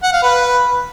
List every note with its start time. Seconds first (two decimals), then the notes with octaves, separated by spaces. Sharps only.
0.03 F#5
0.13 F5
0.23 B4